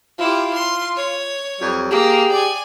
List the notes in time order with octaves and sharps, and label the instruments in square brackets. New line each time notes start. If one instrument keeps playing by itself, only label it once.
[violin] E4 G4 [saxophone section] F4
[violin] C6
C#5
[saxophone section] F2 F#3 G3
[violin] A#3 [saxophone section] G4 G#4
[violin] D5 G#5